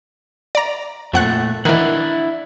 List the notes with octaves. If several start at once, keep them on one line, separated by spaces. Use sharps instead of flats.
D5 A#5
F2 A#2 A3 F#5 F#6
D#3 E3 D4 E4 F#5